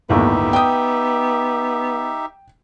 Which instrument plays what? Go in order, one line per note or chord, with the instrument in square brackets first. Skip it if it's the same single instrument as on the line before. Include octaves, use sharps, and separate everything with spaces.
[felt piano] G1 D#2 A2 [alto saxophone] B3 [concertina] D#4 G4 E5
[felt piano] G5 D#6